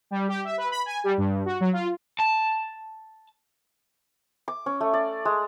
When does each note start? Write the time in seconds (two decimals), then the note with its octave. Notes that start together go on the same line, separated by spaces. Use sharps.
0.11 G3
0.28 G4
0.45 E5
0.58 B4
0.71 B5
0.86 G#5
1.04 G3
1.18 G2
1.45 F#4
1.61 F#3
1.73 F4
2.19 A5
4.48 D6
4.66 C#4
4.81 A3
4.94 D5
5.25 G#3